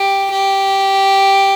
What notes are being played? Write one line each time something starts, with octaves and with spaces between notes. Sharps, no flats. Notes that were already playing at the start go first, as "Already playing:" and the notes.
Already playing: G4
G4